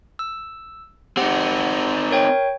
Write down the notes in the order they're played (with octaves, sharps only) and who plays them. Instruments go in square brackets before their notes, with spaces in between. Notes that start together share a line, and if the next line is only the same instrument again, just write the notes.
[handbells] E6
[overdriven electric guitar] C4 D#4 [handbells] G4 F#5
[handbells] A#4 C#5 G5